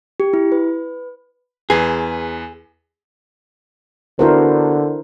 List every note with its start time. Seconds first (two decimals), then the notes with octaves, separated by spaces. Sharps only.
0.20 G4
0.33 E4
0.52 B4
1.70 E2 G#4 B4 C7
4.19 D3 B3 D4 E4 F#4 A#4 C5